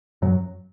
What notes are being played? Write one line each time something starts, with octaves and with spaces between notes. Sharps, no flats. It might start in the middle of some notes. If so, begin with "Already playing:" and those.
F#2 F#3